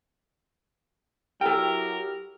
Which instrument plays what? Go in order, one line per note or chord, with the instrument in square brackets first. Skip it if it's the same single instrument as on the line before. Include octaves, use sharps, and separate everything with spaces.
[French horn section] F#3 E4 G4 [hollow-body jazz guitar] A4 G5 [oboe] A#4